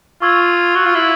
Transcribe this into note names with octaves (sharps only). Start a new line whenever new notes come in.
F4 C#6 E6 G#6
F#4
F4
E4